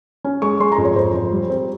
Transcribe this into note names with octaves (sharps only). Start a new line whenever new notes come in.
C#4
G#3 C#6
G#3 C6
A#5
F2
C#5
F2 C5
F2
G3
C4